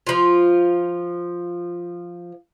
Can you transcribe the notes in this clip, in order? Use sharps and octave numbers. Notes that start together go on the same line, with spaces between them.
F3 F4